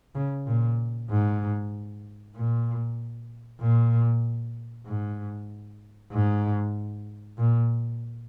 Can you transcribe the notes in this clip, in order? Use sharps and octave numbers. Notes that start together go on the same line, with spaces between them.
C#3
A#2
G#2
A#2
A#2
G#2
G#2
A#2